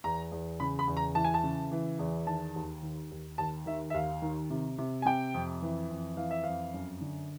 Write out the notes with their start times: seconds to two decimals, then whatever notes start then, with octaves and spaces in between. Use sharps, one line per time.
0.04 E2 A#5
0.32 E2
0.60 C#3 B5
0.79 B5
0.88 E2
0.97 A#5
1.15 E3 A5
1.25 G#5
1.34 A5
1.44 C#3
1.72 E3
1.99 E2
2.26 D#3 A5
2.56 D#2
2.82 D#3
3.11 D#2
3.38 D#2 A5
3.66 D#3 E5
3.90 E5
3.94 D#2 F5
4.22 D#3
4.50 C3
4.78 C3
5.02 G#5
5.05 C3 G5
5.34 F2
5.62 E3
5.90 F2
6.17 E3 F5
6.31 E5
6.44 F2 F5
6.74 F#2
7.01 D3